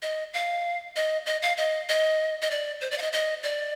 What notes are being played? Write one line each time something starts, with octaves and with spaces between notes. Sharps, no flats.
D#5
F5
D#5
D#5
F5
D#5
D#5
D#5
D5
C5
D5
F5
D#5
D#5
D5